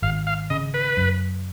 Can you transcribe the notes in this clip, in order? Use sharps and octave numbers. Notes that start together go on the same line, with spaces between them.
G#1 F5
F5
C#3 D#5
B4
F#2